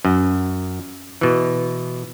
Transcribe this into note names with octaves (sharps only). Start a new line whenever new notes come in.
F#2
B2 E3